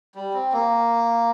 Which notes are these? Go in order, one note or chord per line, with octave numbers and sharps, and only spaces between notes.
G3
C4
A#3